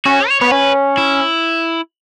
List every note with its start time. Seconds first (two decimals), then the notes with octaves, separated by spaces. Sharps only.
0.05 C#4 F#4
0.28 C#5
0.41 B3 C#5
0.51 C#4 B4
0.97 E4